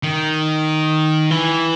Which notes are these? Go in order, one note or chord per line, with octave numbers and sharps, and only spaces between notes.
D#3
E3